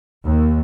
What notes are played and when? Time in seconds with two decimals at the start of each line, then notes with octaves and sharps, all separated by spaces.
0.24 D#2